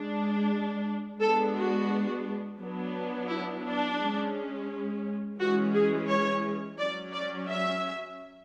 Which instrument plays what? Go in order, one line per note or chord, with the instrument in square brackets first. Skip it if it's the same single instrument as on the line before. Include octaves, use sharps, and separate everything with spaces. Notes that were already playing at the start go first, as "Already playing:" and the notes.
Already playing: [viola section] G#3 D4
G#3 B3 D4 A4
F#4
F#3 B3 D4
E4
D4
G#3 C#4
E3 G#3 C#4 F#4
G#4
C#5
F#3 C#4 D5
D5
E5